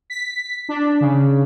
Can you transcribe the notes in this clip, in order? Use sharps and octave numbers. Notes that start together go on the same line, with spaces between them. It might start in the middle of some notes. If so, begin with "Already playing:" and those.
B6
D4
C#3